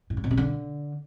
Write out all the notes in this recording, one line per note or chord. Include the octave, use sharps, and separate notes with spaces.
A2
G2
B2
C3
D3